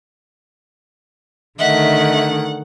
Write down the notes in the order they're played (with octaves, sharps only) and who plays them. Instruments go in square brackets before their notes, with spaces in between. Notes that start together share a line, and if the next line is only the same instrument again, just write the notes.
[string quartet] D3 D#3 A3 [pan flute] D#5 [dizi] E5 [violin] F#5